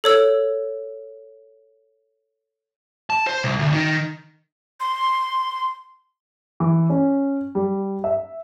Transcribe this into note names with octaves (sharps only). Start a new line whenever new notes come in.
A4 C#5 E6
A5
C5
C2
D2
D#3
C6
E3
C#4
G3
E5